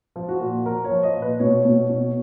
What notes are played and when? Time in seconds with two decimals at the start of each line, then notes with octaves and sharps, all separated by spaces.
0.16 F3
0.29 F#4
0.41 A#2
0.66 F3 A#4
0.85 C#5
0.91 F3
1.03 D#5
1.15 A#2
1.22 B4
1.39 B2 C#5
1.65 B2
1.89 B2